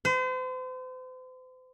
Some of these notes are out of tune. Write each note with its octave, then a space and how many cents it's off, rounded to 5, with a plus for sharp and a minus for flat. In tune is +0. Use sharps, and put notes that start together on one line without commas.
C5 -40